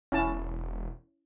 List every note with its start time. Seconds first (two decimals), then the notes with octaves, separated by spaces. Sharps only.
0.12 E1 C#4 E4 A5